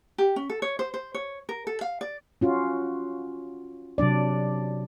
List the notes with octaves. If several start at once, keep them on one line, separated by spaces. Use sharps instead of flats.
G4
C#4
A4
C#5
C5
C5
C#5
A#4
A4
F5
D5
C#4 F4 F#4
C3 F#3 D4 D5